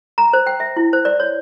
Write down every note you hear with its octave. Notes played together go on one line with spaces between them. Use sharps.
A#5
C5
G5
E5
E4
C5
D5
C#5